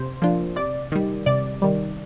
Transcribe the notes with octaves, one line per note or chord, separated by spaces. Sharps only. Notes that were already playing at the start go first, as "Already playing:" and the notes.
Already playing: C3 C5
F3 A#3 D4 F4
C3 D5
D#3 G3
C3 D5
D#3 G3